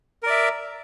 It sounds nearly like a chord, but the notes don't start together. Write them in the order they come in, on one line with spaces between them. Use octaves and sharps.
A#4 D5 E5